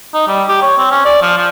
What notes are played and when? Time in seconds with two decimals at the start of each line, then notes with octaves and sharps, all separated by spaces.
0.14 D#4
0.28 G3
0.48 G4
0.62 C#5
0.78 C4
0.91 C#4
1.05 D5
1.22 F3
1.37 F3